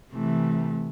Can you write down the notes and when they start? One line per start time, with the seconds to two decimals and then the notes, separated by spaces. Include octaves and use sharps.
0.11 C3 E3 A3